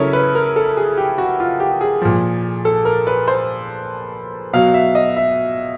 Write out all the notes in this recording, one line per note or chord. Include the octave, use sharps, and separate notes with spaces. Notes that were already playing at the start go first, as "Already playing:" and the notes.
Already playing: C#3 F#3 E4 A4 A#4 C#5
B4
A#4
A4
G#4
G4
F#4
F4
G4
G#4
A#2 F3
A4
A#4
B4
C5
B2 F#3 F5
E5
D#5
E5